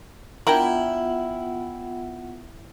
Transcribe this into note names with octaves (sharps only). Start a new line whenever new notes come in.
B3 D4 E4 F4 A#4 F#5 G5 F#7